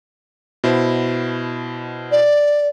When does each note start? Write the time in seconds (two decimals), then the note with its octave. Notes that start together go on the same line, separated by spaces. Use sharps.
0.64 B2 E4 C5
2.11 D5